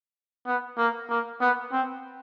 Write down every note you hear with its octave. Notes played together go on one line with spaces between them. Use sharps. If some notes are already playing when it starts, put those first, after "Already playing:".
B3
A#3
A#3
B3
C4